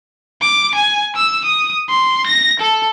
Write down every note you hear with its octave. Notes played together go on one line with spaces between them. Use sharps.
D6
G#5
E6
D#6
C6
A#6
A4